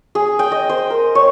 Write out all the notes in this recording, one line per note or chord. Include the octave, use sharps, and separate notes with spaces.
G#4
G5
D#5
C5
A#4
C#5